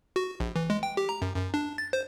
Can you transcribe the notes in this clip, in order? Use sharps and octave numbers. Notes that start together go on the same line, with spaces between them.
F#4
A#1
E3
G#3
G5
G4
A#5
F#2
F#2
D4
A6
C5